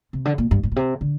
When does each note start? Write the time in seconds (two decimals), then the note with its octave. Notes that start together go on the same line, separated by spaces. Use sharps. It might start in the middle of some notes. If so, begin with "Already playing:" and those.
0.13 C3
0.25 D3
0.38 A#2
0.51 G2
0.63 G2
0.72 A#2
0.76 C3
1.01 D3